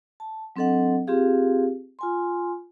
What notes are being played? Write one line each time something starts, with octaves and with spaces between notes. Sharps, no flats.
A5
F#3 C4 D4 A4 D#5 F#5
C4 F4 G4 G#4 F5
F4 G#5 C6